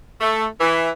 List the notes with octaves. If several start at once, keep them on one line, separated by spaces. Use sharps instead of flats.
A3
E3